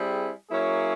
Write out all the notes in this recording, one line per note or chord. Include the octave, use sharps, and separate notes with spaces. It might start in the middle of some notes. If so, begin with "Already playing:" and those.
Already playing: G3 C4 E4 G#4
F#3 A#3 C#4 E4 G#4